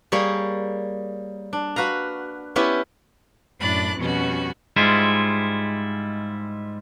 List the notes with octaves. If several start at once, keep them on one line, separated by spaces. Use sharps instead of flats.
G3 A#3 G#4 C#5
D4
F#4 B4 F5 A#5
B3 C#4 E4 G4 B4
F#2 A2 D4 D5 B5 F#6
F2 B2 G3 C#4 F#4
G#2 G3 G#3 E4 F4